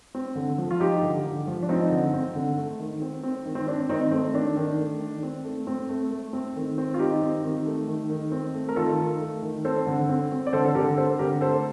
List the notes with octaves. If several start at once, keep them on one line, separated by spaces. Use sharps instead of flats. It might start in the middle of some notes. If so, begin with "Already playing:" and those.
C4
D3
F3
F4
F3 D#4 G4
D3
D3
F3
D4
F3 C4 D#4
D3
C4
D3
A3
D#3
C4
C4
D#3
C4
C4 D4
D#3 C4 D#4
A3 C4
D#3 D4
D#3
A3
D#3
C4
A3
C4
A3
A3
C4
D#3
C4
F4
D#3 D#4 G4
C4
D#3
A3
D#3
D#3
C4
A3
A#4
D#3 F4 A4
D#3
A3
D#3
C4 A4 C5
D3
C4
C4
D5
D3 A4 C5
A4
D3 G4 A#4
C4 A4 C5
D3 G4 A#4
A3 A4 C5